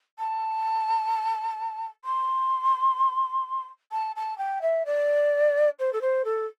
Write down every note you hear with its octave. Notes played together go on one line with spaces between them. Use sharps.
A5
C6
A5
A5
G5
E5
D5
C5
A4
C5
A4